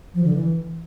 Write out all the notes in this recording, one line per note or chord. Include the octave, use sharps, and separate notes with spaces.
F3
D3
E3